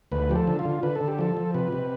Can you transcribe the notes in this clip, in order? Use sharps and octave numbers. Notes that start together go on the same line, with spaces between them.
D2 B4
F3 G4
A4
D3
F4
D3
D3 B4
A4
D3
G4
F3 A4
F3
C3 B4
C3